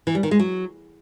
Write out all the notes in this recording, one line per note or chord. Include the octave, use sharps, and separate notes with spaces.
E3
G3
D#3
G#3
F#3